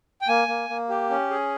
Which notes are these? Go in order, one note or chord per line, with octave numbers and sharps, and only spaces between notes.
G5
A#3 G#5
A#3
A#3
G4
C#4
G#4